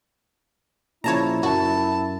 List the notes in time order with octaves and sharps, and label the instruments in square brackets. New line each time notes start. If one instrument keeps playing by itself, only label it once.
[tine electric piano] A#2 C#3 F3 [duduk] E4 [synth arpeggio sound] C#5 A5 A#5
[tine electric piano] F#2 [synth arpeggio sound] F#4 [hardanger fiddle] A5